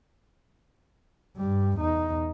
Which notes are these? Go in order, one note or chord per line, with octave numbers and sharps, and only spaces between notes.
G2 G3
E2 D#4